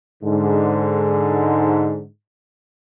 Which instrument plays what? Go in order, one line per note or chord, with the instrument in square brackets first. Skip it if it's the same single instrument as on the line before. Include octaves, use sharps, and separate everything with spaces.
[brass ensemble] G#2 D3